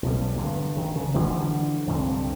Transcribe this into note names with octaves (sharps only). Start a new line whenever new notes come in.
B1 G3
G2 D3
D#3
C#3
D3 E3 F3 G3
C2 G2 D3 C4